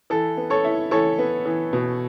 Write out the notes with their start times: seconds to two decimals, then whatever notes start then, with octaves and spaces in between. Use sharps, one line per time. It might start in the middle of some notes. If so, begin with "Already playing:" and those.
0.10 E3 A4
0.37 B3
0.50 A4 C#5
0.64 E4
0.91 E3 A4 C#5
1.18 B3
1.46 E3
1.73 B2